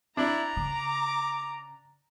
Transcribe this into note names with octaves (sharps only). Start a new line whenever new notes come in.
D4 E4 A#5
C#3 D6